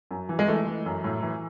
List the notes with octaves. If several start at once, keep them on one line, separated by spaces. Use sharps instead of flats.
F#2
E3
G#3
E3 A3
E3
F#2
A2
E3